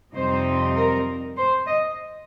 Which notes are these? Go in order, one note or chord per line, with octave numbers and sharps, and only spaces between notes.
F2 C3 G3 C4 D#4 C5
A#4
C5
D#5